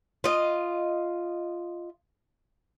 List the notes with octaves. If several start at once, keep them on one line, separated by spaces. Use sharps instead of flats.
F4 D#5